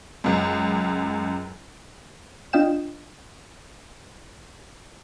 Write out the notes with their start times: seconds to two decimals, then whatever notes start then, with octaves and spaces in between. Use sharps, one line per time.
0.24 C#2 F#2
2.53 D4 F4 D#5 F5 G5 E7